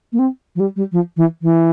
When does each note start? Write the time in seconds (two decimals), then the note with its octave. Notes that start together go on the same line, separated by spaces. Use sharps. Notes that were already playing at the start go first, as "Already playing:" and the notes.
0.12 A#3
0.19 C4
0.55 F3
0.60 G3
0.76 G3
0.92 F3
1.16 E3
1.42 E3